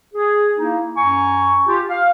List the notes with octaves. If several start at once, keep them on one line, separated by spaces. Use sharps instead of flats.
G#4
A#3 D#4 E4
F#2 G#5 A#5 C#6
F4 G4
F5